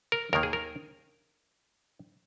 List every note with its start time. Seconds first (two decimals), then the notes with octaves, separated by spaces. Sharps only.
0.12 A#4
0.33 D#2 D#3 A#3 A#4
0.43 G#4
0.53 A#4